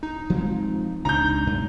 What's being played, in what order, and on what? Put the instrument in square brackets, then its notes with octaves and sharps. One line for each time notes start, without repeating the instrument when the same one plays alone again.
[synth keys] D#4
[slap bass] F3 G#3 C4
[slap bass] C#2 C3 D4 [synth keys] D#4 [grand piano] A#5 G6
[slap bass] F#2 B2 G#3